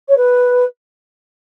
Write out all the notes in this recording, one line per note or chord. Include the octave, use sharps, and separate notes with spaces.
C#5
B4